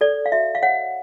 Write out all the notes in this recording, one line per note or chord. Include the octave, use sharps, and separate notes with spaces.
A4 D5
F5
F#4 E5
F5
C#5 F#5